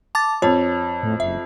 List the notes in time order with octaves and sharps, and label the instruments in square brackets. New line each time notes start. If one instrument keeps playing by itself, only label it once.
[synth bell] A5 D6 A6
[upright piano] F2 [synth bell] C#5
[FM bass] A2
[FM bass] F#1 [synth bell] E5